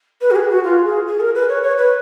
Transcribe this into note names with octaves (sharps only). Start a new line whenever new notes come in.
B4
F#4
G#4
F#4
F4
G#4
G#4
A#4
B4
C#5
C#5
B4